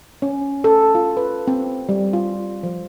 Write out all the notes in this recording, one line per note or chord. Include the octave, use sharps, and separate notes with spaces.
C#4
A4
F4
B4
C4
G3
F4
F3